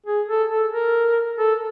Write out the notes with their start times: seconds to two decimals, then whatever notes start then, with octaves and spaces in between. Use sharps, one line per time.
0.06 G#4
0.28 A4
0.50 A4
0.72 A#4
1.39 A4